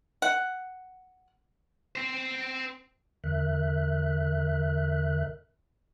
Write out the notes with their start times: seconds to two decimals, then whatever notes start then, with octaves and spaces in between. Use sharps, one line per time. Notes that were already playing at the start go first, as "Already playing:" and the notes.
0.22 F#5
1.96 C4 C5
3.24 E2 D3 A#4 E5 F#6